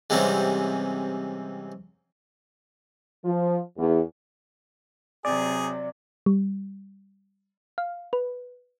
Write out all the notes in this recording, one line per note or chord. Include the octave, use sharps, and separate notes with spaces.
G#2 C3 E3 G3 C4 C#4
F3
E2
C3 F#3 G#4 D5
G3
F5
B4